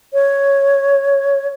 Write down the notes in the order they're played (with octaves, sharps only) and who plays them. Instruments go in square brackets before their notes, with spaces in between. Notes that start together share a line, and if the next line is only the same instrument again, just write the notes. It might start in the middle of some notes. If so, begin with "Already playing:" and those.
[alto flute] C#5